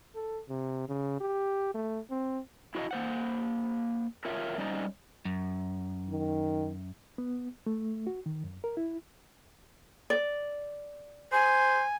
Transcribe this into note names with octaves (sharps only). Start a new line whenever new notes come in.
A4
C3
C#3
G4
A3
C4
E4 F#4 B4 C#5 D#5 F5
A#3 C5 F#5
F4 A#4 C#5 E5 F5
G3 C#4 D#4 C5 D5 D#5
F#2
D#3
B3
A3
F#4
D#3
F#2
A#4
E4
D5
C5 G#5